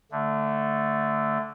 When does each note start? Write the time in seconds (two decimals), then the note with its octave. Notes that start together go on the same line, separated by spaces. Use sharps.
0.12 D3 A3